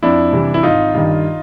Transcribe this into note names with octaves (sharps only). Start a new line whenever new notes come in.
F2 D4 E4
C3 E3 G3
E4
G#1 D#4 F4
G2 D#3